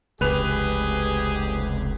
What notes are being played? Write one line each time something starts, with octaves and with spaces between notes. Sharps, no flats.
F1 C#2 G4 G#4 B4 F7